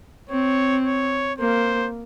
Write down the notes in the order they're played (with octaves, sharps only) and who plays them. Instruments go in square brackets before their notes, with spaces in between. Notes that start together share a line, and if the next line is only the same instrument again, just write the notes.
[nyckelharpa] C4 [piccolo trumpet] C#5
[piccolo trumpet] C#5
[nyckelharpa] A#3 [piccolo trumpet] C5